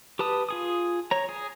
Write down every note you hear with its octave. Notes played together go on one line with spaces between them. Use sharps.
G4 B4 A5 D#6
F4 G#4 D#6
C#5 A#5
G#4